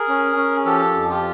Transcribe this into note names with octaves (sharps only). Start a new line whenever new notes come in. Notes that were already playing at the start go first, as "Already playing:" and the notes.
Already playing: G#4 A#4
C#4
C#4
F3 G4 A4
F2
F4 G4